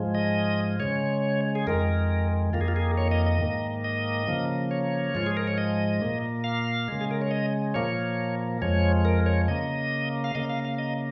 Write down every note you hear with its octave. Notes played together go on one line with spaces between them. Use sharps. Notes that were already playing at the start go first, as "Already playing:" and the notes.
Already playing: G#2 F3 G#3
D#5
C#3 G#3 C#5
G#4
F2 D#3 G#3 A#4
F2 D#3 A#3 F4
G#4
F4
G#4
C#5
D#5
D#5
G#2 D#3 A#3
D#5
C#3 F3 A#3
C#5
G#2 F3 G#3 F4
G#4
A#4
C#5
D#5
A#2 A#3
F5
C#3 G#3
G#4
A#4
C#5
D#5
A#2 F3 A#3 C#5
F2 F3 G#3 C#5
A#4
C#5
C#3 A#3 D#5
F5
C#3 A#3 D#5
F5
F5
D#5